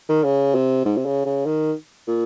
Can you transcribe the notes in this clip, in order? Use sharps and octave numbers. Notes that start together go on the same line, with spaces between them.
D#3
C#3
C3
G#2
C3
C#3
C#3
D#3
A#2